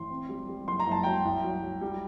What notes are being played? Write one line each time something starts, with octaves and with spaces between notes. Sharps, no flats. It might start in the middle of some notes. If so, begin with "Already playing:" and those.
Already playing: A1 C6
C4
G3
G3
F#1 C6
A#5
F#1 A5
F#3 G5 A#5
C2
F#3
F#3
G3